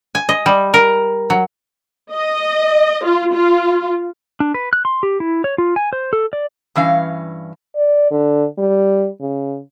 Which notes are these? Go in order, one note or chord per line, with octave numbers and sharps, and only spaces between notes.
G#5
D#5
G3
A#4
F#3
D#5
F4
F4
D4
B4
F#6
C6
G4
E4
C#5
F4
G#5
C5
A4
D5
G2 E3 C#4 F5
D5
D3
G3
C#3